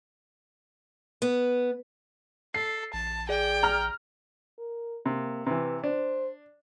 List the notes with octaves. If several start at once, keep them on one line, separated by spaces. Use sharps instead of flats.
B3
A4 C7
A#1 A5
G#4 D5 G5
A#5 F6
A#4
C3 A#3
C3 E3 B4
D4 C5